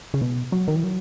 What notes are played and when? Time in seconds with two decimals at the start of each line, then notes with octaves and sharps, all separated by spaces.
0.14 C#3
0.21 B2
0.52 F#3
0.68 D#3
0.76 E3
0.84 F#3